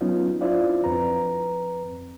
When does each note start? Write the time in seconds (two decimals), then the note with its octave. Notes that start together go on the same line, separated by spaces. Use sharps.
0.01 F#3 B3 C#4 D#4 F4
0.41 D4 E4 F4 C5 D5 F5
0.84 F2 C4 B4 A#5